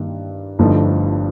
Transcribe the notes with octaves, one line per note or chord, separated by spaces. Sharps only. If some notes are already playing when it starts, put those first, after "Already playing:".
Already playing: G2 D#3 A#3
G1 G2 F3 A3 D#4